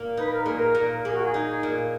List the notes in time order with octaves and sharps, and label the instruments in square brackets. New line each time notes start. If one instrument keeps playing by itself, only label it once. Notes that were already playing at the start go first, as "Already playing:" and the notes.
Already playing: [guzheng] A#2 A#3
[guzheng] D#4 [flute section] B4
[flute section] A#4
[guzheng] A#2 [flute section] G#4
[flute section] A#4
[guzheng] A#2
[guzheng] A#3 [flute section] G#4
[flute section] F#4
G#4
[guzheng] D#4
A#2